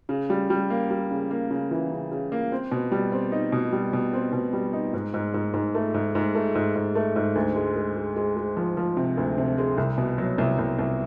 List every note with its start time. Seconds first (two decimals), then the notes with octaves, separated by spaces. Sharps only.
0.09 C#3
0.30 G3
0.50 G3
0.70 A#3
0.90 G3
1.11 C#3
1.31 A#3
1.51 C#3
1.71 E3
1.92 C#3
2.11 C#3
2.32 A#3
2.52 C4
2.72 B2
2.92 G3
3.12 C4
3.32 D#4
3.52 B2
3.73 G3
3.93 B2
4.13 C4
4.33 B2
4.53 G3
4.73 D#4
4.94 G#2
5.14 G#2
5.34 G#2
5.54 G#2
5.75 A3
5.94 G#2
6.15 G#2
6.35 A3
6.55 G#2
6.76 G#2
6.95 A3
7.16 G#2
7.35 D2
7.56 G#3
7.76 G#3
7.97 G#3
8.16 G#3
8.36 G#3
8.57 F3
8.77 F3
8.97 C3
9.17 D2
9.38 C3
9.58 G#3
9.78 C2
9.98 B2
10.18 F#3
10.38 C2
10.59 C2
10.79 C2